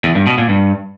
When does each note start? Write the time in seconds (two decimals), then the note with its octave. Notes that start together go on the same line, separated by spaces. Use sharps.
0.04 E2
0.15 G2
0.27 B2
0.38 A#2
0.49 G2